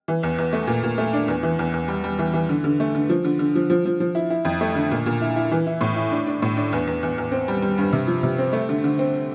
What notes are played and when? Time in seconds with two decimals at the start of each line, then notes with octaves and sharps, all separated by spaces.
0.08 E3
0.23 E2
0.38 E2
0.53 A3
0.67 A#2
0.83 A#2
0.98 A3
1.13 D4
1.28 E2
1.43 E3
1.59 E2
1.74 E2
1.88 G3
2.04 G3
2.19 E3
2.34 E3
2.49 D3
2.64 D3
2.80 A3
2.95 D3
3.09 F3
3.25 D3
3.39 D3
3.55 F3
3.70 F3
3.85 F3
4.00 F3
4.15 E4
4.30 E4
4.45 F2
4.61 A3
4.75 D3
4.91 A#2
5.06 A#2
5.21 E4
5.36 E4
5.51 E3
5.67 E4
5.81 A2
5.96 E4
6.11 D4
6.27 D4
6.42 A2
6.57 D4
6.73 E2
6.87 E2
7.03 E2
7.18 E2
7.32 C4
7.48 G3
7.62 G3
7.78 G2
7.93 C3
8.07 F3
8.23 C3
8.38 C4
8.53 A3
8.69 D3
8.84 D3
8.99 C4